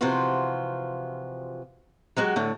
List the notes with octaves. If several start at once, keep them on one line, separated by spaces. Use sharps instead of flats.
C3 E3 F3 F4 F#4
F#3 G#3 F#4 G4
A2 D3 A3